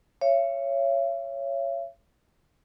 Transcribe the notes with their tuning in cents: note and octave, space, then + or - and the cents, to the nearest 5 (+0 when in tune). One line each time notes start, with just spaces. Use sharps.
C#5 +0 E5 +45